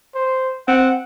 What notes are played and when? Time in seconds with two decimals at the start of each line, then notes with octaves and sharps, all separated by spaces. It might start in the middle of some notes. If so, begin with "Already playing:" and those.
0.15 C5
0.68 C4 F#5